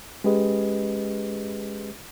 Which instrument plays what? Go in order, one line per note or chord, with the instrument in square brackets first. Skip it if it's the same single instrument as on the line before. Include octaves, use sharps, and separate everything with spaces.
[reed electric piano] G#3 C#4 G4 G#4 B4 D#5